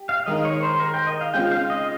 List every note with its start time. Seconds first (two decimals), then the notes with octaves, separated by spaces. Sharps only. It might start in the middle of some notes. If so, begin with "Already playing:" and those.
Already playing: G4
0.09 F5
0.26 D#3 G#3 D#4 A#4 D#5
0.45 C#5
0.62 C5
0.80 A#4
0.94 G5
1.07 D#5
1.21 F5
1.34 C#3 G#3 C4 F4 G5
1.51 F5
1.70 D#5